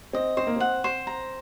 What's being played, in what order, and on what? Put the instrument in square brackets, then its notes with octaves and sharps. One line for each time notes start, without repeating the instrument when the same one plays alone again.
[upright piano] C4 [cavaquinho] D#5
[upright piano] C4 [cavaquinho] C5
[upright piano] A#3
[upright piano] C4 [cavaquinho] F#5
[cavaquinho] C5
A#5